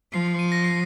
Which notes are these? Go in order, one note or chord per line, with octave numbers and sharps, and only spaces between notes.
F3 C7
C7
D#7
A#6
C7